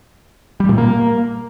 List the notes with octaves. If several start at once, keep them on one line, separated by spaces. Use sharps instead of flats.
G3
A#2
A#3